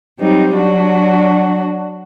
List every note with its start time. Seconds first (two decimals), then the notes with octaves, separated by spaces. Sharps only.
0.19 F#3 G3 C4 D#4
0.54 F#3 D4 F#4